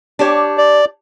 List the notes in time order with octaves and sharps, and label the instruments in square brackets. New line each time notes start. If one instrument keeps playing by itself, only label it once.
[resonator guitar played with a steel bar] D4 G4 C#5
[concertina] D5